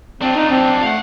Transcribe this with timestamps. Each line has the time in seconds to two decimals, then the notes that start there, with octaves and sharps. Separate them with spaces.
0.21 C4 D4 F4
0.35 D#4
0.50 C4
0.82 A3 F5 F#5